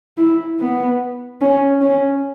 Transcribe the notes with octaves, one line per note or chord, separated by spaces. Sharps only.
E4
B3
C#4
C#4